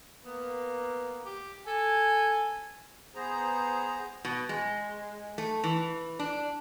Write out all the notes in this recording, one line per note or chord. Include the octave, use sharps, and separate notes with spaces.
A#3 B3
G4
A4 G#5
B3 G#4 C5 A#5
B2
G#3
A3
E3
D4